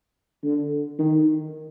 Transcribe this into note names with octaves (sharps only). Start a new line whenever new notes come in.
D3
D#3